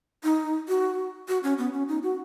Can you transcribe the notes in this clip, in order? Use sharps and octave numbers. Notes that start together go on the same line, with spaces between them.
D#4
F#4
F#4
C#4
B3
C#4
D#4
F#4